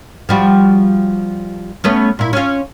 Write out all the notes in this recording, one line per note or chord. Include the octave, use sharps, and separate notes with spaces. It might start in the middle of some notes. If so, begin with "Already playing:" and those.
F3 G3 F#4
A3 B3 C#4
A#2 E4
C#4 F4